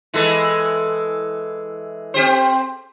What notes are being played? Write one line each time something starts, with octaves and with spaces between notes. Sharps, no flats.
E3 G#3 A4
C4 G4 C5